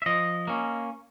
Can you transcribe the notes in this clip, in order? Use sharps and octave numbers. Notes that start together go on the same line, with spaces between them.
E5
F3 D#5
A#3 C#4